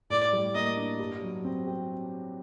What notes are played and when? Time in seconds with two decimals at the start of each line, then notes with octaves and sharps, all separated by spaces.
0.10 A2 D5
0.33 G3
0.55 A#3 D#5
0.77 D4
0.99 G2
1.22 F#3
1.44 C4
1.67 G4